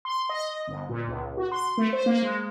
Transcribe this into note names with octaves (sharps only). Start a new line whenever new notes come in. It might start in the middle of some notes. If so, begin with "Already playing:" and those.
C6
D#5
G1
A#2
C#2
F#4
C6
A3
C5
A#3
G#3